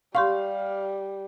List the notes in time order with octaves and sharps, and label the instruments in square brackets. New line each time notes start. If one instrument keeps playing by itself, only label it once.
[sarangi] G3 [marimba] G4 C6 C#6 [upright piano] F5